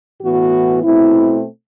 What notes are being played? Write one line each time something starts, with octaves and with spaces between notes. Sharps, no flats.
A2 E3 B3 F#4
B2 A3 C4 E4